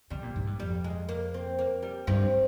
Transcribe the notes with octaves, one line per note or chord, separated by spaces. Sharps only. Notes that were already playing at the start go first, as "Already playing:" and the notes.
C#3 G3
A#2
G#2
G2
F2 G3
G#3
A#3
C4
A#3
G3
G2 C4